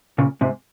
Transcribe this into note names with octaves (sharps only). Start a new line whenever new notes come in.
A#2 C#3
G#2 C3